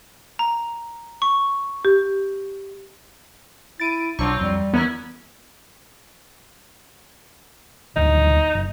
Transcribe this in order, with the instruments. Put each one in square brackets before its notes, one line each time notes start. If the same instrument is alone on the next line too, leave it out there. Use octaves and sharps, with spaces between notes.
[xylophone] A#5
C#6
[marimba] G4
[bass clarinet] E4 [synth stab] A6 D7 D#7
[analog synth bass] B1 [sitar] F#3 C4 F4 [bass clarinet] D4 [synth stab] C#6
[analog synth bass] F2 [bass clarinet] G3
[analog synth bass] E2 [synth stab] B3 [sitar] C#4 E4 A#4
[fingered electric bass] E1 D2 [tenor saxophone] D#4
[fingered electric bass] F#1